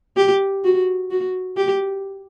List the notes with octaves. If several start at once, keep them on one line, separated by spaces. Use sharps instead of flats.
G4
F#4
F#4
G4